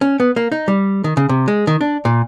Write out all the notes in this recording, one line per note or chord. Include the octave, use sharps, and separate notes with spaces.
C#4
B3
A#3
D#4
G3
D#3
C#3
C3
G#3
D#3
D4
A#2